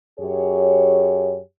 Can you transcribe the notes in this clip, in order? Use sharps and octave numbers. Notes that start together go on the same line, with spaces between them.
F#2 G4 G#4 C#5